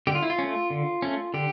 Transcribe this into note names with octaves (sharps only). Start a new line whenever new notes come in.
D3 G4
F4
E4
F4
A3 C#4
D3
A3 C#4
D3 G4